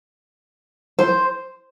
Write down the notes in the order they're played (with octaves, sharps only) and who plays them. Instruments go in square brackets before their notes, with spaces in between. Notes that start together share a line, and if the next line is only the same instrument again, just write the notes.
[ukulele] C5